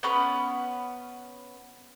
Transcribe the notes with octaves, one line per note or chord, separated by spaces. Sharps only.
B3 C#4 B4